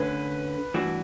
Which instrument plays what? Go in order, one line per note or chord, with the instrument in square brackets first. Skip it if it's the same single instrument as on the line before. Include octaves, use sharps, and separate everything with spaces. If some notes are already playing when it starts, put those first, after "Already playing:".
Already playing: [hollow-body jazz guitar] D3 A3 C#4 [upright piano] B4
[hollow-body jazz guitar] G2 E3 A3 D4 F#4